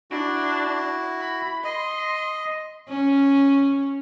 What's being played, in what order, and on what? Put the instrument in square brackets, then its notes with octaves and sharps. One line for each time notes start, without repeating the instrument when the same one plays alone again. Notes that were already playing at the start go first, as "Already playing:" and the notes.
[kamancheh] D4 [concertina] E4 F#4
[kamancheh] B5
[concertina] D#5 [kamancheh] C6
[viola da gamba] C#4